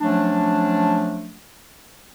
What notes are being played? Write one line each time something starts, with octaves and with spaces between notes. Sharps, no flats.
F3 F#3 A3 C#4 D4